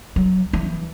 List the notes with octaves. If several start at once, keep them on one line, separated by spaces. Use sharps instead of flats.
F#3
E3